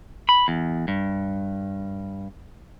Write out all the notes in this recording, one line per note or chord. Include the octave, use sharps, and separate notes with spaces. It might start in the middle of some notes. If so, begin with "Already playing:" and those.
B5
E2
G2